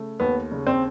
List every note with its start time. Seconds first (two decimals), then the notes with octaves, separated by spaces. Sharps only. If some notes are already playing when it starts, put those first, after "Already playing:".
Already playing: C#3 A3
0.20 D#2 B3
0.52 C#3
0.67 C4